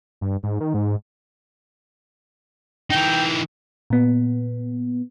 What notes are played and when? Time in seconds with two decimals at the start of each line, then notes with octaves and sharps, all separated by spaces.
0.21 G2
0.43 G#2
0.60 D#3
0.74 G#2
2.91 E3 D#4 G5
3.90 A#2 B3